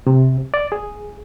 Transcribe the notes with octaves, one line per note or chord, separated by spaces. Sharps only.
C3
D5
G#4